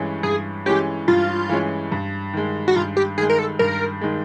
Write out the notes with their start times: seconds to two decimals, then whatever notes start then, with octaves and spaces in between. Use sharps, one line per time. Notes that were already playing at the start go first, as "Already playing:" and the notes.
Already playing: G2 E3 G#3 C#4
0.23 G2 G#4
0.66 E3 G#3 C#4 G4
1.08 G2 F4
1.49 E3 G#3 C#4
1.92 G2
2.34 D#3 G#3
2.68 F#4
2.76 G2 F4
2.97 G4
3.18 D#3 G#3 G#4
3.30 A#4
3.39 A4
3.59 G2 A#4
4.01 D#3 G#3